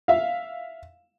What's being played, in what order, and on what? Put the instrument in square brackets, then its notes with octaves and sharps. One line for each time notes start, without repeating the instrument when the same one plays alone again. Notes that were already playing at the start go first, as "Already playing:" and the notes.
[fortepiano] E5 F5